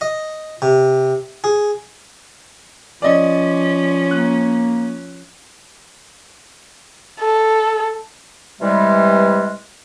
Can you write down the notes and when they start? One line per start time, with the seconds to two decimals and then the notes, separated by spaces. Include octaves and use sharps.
0.01 D#5
0.62 C3
1.44 G#4
3.02 F3 C#4 D5 D#5
4.11 A#3 F#6
7.21 A4
8.61 C3 E3 G3 G#3